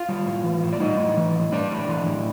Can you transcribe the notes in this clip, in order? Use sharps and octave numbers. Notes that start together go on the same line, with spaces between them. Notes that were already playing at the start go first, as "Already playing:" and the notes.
Already playing: F4 F5
G3
A2
E3
A2
D5
G3 D#4 D#5
A2
E3
A2
G3 D4 D5
A2
E3
A2